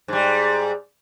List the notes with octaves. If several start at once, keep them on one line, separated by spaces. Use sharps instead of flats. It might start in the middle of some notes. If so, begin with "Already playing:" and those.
G#2 G3